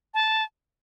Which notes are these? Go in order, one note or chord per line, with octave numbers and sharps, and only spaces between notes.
A5